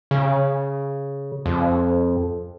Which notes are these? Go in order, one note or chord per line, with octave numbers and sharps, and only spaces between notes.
C#3
F2